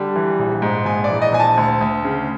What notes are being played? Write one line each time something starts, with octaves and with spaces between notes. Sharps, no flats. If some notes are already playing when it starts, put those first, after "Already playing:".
Already playing: D3 G3
E3
A#1
G#2
A#1 G#5
D5
E3
D#5
A#1 G#5
A5
D2
D2
C#3